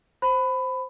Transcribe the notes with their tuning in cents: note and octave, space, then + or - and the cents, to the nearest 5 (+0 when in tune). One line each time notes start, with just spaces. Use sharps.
C5 +0 B5 +20